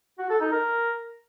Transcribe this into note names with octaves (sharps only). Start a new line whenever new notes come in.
F#4
A4
D#4
A#4